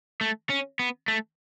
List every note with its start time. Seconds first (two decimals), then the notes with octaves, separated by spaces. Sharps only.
0.21 A3
0.50 C#4
0.79 B3
1.08 A3